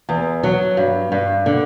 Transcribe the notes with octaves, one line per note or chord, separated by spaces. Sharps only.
E2
F#3
G2
G2
D3